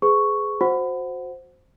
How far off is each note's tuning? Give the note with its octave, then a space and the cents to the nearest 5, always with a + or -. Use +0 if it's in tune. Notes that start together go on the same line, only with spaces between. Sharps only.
G#4 +5 B4 +35 C#6 +0
F#4 -20 C5 +0 F#5 +0